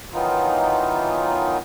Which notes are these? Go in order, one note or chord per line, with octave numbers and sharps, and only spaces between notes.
D#3 E3 F#3 B3 D#4 F4